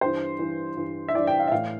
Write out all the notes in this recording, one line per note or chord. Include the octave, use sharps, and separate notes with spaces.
G2 E3 C5
G2 E3
G2 E3
E5
G2 E3 D5
G5
F5
E5
A2 E3 F5